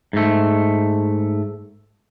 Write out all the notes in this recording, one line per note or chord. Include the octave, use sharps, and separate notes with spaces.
G#2 A3